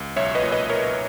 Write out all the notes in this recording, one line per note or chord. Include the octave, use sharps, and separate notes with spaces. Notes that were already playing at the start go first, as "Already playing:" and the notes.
Already playing: C#2
B1 C#5 E5
B4 D#5
A#2
B4 D#5
B1 A#4 C#5